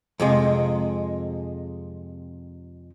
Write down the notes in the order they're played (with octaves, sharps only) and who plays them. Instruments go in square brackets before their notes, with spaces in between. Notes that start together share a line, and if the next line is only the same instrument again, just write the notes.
[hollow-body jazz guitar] F2 C3 G#3